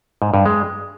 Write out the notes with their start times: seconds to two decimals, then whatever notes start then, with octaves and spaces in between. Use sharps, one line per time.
0.22 G#2
0.34 G2
0.46 G#3